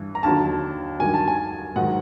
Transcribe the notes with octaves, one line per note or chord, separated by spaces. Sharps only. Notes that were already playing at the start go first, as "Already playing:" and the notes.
Already playing: G2 E3
A#5
D#2 D3 F#3 A5
G2 D#3 F#3 G#5
A5
G#5
G#2 D#3 F#3 F#5